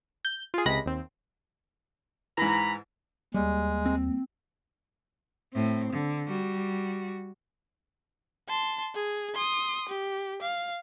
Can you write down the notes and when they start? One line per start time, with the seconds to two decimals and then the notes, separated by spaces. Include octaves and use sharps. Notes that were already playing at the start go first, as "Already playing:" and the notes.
0.25 G6
0.54 F4 G#4
0.66 C#2 C3 G#3 B5 A#6
0.86 D#2 C4
2.38 G#2 E3 A#5 B5
3.34 D#2 G3 G#3
3.86 C4
5.53 A2 C4
5.93 D3
6.28 G3 F#4
8.49 A5 C6
8.95 G#4
9.34 C6 D#6
9.89 G4
10.42 F5